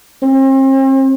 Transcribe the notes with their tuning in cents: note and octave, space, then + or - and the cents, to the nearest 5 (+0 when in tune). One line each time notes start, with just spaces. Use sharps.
C4 +40